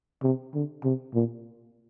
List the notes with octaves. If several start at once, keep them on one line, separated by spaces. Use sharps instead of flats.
C3
D3
C3
A#2